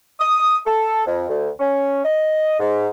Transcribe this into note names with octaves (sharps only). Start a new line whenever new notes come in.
D#6
A4
F2
D2
C#4
D#5
G#2